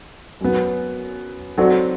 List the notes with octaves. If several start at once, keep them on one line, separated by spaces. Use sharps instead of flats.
F#2 F#3 B3
F#3 C4 F#4 A4 D5